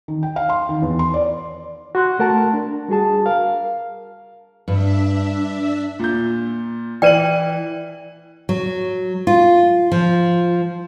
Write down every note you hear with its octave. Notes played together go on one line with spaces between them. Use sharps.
D#3
G5
F5
C6
D#3
E2
C6
D5
F#4 C6 F#6
A3 A#4 F#5 A5
D4
G3 F#4 G#4 A5
A#4 F5
G2 D4 E5
A#2 G6
E3 B4 D5 G5 D#7 F#7
F#3
F4
F3